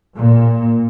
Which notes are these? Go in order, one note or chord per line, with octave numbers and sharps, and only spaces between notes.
A#2